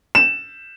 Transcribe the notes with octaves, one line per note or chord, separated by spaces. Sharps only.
E7